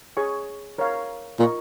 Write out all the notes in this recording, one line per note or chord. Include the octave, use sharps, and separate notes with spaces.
G#4 C#5 G#5 C#6
A#4 C#5 F5
A#2 F4 A#4 D#5 C#6